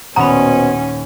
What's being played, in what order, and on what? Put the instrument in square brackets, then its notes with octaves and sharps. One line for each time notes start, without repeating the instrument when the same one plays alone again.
[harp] D#1 F#5 D#6 [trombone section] B2 C5 [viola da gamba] C#4 [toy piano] A#5 B5